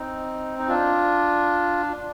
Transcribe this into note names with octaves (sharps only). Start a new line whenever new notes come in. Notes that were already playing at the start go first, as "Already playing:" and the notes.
Already playing: C4 D#4
D#4
D4 F4